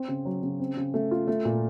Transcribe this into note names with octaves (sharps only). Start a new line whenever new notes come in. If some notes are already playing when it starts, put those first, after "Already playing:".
Already playing: C4
C#3
F#3
C#3
C4
C#3
A3
F4
A3
A#2